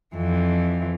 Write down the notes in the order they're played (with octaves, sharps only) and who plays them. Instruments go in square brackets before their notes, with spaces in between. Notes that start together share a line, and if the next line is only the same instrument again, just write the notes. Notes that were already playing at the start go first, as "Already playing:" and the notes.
[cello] F2 E3